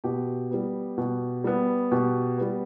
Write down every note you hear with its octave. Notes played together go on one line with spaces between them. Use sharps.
B2 G4
G3 B3
B2
G3 B3
B2 G4
G3 B3